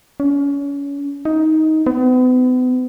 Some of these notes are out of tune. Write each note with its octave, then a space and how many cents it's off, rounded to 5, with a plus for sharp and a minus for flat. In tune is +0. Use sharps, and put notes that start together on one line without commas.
C#4 +30
D#4 +15
B3 +40